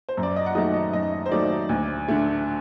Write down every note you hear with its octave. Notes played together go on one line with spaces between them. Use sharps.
C5
F#2
D5
D#5
F#5
D#3 F#3 A3 D#5
D#5
F#2 D#5
C5
D#3 F#3 A3 D5
D2
D3 A3